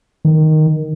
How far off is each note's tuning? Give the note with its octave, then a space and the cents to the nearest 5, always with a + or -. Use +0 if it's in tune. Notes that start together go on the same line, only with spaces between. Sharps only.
D#3 +0